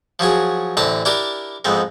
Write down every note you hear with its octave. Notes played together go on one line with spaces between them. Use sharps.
F3 F#3 F#4 G#4
A1 D3 C4 E5 A5 A#5
D4 E4 G4 A#4 D5
F2 G#2 B3 C4